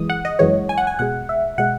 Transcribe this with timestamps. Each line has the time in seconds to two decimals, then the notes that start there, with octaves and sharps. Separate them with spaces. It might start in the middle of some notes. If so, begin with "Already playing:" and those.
Already playing: F#2 E3 G#3 D#6
0.09 F#5
0.25 D#5
0.39 F#2 E3 G#3 C#5
0.69 G#5
0.78 F#5
0.87 G#5
0.99 B2 G#3 F#5
1.29 E5
1.58 B2 G#3 F#5